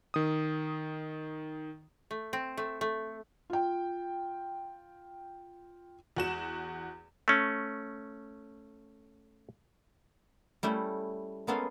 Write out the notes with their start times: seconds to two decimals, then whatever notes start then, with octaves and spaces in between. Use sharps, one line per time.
0.14 D#3 D#6
2.11 A3
2.33 C4
2.57 A3
2.81 A3
3.50 F4 G5
6.17 E2 F#4 E7
7.28 A3 C#4
10.63 G3 A3 C#4 E4
11.47 G#3 A#3 B3 C#4 A4 F5